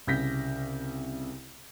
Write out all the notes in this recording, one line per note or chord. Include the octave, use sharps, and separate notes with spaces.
C2 C#3 G6 A#6 B6